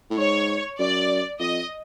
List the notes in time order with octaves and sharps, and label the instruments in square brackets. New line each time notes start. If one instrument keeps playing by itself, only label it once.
[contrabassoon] A2
[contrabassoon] G#2 [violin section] C#5
[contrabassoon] F#2 [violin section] D5
[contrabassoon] F2 [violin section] D#5